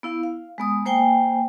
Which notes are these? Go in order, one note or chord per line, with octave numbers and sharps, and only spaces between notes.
B3 E4 F5
F5
G#3 B3 D#6
A#3 C5 G5 G#5